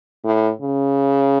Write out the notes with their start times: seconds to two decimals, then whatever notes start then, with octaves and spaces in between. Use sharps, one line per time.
0.25 A2
0.61 C#3